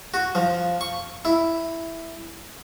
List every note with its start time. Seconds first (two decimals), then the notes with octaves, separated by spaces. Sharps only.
0.14 F#4
0.35 F3
0.81 C#6
1.25 E4